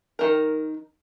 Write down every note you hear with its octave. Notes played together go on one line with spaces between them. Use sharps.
D#3 A#4